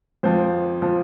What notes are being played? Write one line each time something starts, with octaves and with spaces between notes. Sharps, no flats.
F2 F3 C5
F3